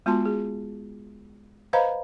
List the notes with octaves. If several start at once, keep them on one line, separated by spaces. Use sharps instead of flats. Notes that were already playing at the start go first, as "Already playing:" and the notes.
G#3 B3 F4 F#4 A5 C6
G#4
B4 C5 D#5 F5 A#5 B5